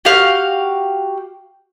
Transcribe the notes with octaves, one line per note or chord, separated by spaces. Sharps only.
F#4 G4 F5